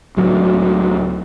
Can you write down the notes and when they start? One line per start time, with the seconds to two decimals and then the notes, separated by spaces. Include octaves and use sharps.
0.17 C#2 A2 F#3